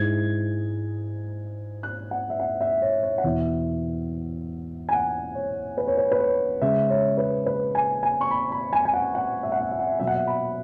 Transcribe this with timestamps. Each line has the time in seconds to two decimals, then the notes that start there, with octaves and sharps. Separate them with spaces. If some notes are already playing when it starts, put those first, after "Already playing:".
Already playing: G#2 G#3 E4 G#6
1.83 F#6
2.11 F#5
2.30 E5
2.40 F#5
2.61 E5
2.82 C#5
3.03 C#5
3.18 F#5
3.24 E2 B2 B3 E4 E5
4.89 G#5
4.93 F#5
5.35 C#5
5.78 B4
5.87 C#5
5.97 B4
6.11 B4
6.19 C#5
6.61 C#3 G#3 C#4 E5
6.90 C#5
7.18 B4
7.46 B4
7.75 G#5
8.03 G#5
8.21 C#6
8.31 B5
8.52 B5
8.73 G#5
8.85 G#5
8.94 F#5
9.15 F#5
9.43 E5
9.52 F#5
9.61 E5
9.71 E5
9.79 F#5
9.87 E5
9.99 B2 F#3 B3 E5
10.07 F#5
10.15 E5
10.27 B5